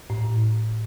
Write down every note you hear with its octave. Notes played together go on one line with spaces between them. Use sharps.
A2